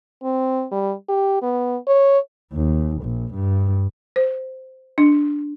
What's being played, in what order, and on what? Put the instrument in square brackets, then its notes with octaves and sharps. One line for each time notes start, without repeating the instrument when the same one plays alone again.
[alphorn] C4
G3
G4
B3
C#5
[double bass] D#2
A#1
G2
[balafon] C5
D4